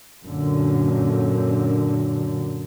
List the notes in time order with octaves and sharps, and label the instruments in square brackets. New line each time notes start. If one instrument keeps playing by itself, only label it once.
[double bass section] F#2 A#2 D3